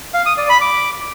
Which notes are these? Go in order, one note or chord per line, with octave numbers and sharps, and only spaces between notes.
F5
D#6
D5
B5
D6